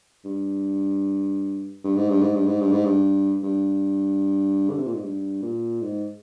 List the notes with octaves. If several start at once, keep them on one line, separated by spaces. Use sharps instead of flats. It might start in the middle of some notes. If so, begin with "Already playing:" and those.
G2
G2
G#2
G2
G#2
G2
G#2
G2
G#2
G2
G2
D3
C3
A#2
G#2
G2
A#2
G#2